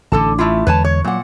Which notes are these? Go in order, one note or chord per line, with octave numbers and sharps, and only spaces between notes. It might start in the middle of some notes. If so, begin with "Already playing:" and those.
A1 D3 A4 A5
A3 E4 F4
E2 D3 G#3 B4 C#5 A5
C#5
A#2 F#3 F#5